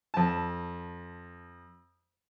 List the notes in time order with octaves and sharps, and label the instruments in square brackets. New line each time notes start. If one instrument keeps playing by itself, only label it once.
[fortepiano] F2 A5